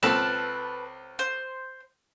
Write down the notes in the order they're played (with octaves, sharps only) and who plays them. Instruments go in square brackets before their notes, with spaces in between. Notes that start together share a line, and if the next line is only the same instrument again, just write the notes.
[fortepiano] C#2 C4 A4 [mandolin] B4 A5 F6
[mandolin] C5